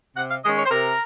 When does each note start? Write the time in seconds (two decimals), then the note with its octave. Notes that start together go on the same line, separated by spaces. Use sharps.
0.16 C3 F#5
0.29 F5
0.44 D#3 G#3 C#4 D#5
0.57 C#5
0.65 C5
0.71 C3 A#4